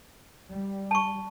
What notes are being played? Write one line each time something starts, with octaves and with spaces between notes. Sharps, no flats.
G3
A5 C#6